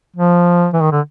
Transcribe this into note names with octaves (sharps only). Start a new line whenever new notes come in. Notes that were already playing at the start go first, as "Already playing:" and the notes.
F3
E3
D#3
D3